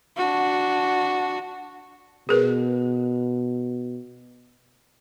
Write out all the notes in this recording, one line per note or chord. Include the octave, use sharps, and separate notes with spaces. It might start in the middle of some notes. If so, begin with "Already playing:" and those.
D4 F#4
B2 G#4 A#4 B4